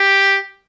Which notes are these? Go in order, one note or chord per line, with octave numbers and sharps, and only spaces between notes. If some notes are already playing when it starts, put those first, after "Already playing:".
Already playing: G4